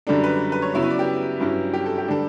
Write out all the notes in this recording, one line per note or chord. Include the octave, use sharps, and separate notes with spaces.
F#2 D3 G3 D4 A4
B4
B4
C#5
C#3 F#3 B3 E4 C#5
B4
D5
G4
G2 F#3 C#4 E4
G4
A4
G4
D3 G3 D4 A4